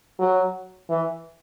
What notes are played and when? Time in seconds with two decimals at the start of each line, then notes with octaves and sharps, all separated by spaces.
0.19 F#3
0.90 E3